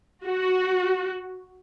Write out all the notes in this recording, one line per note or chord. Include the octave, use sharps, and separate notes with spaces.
F#4